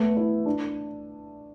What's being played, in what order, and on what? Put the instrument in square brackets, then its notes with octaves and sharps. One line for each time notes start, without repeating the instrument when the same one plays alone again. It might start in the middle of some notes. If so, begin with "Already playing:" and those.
Already playing: [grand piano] A3 B3
E4
D4